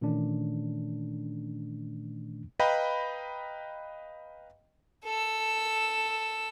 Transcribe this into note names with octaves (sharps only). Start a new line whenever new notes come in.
A#2 D#3 E3 A3 C#4 D4
B4 D#5 F5 G5 A#5 B5
A4 E6